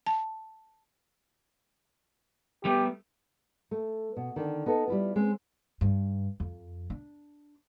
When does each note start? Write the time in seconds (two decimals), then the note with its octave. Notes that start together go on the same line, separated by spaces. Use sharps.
0.06 A5
2.65 G3 A3 B3 G4
3.71 A3
4.17 B2
4.36 D3 D#3
4.66 B3 D#4 A4
4.88 G3 E4 F4
5.16 G#3 C4 C#4
5.81 G2
6.40 F2
6.90 D4